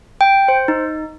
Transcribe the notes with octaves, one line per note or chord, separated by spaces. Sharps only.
G5
C5
D#4